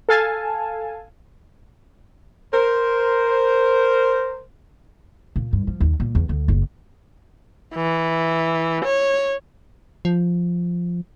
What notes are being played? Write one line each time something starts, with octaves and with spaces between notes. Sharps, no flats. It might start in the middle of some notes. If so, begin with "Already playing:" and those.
A4 F5 G#5 A5
A#4 C5
A#2
G2
F3
D#2
A#2
E2
D2
F#1
E3
C#5
F3